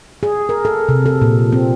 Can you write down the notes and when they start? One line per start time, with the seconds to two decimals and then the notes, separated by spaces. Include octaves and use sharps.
0.23 G#4
0.49 A#4
0.65 A4
0.89 C3
1.06 A4
1.21 A#2
1.52 C4